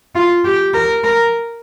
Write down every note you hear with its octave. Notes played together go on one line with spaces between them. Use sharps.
F4
G4
A#4
A#4